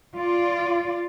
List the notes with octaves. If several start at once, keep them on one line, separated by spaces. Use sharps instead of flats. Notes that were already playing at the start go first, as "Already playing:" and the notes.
F4 D5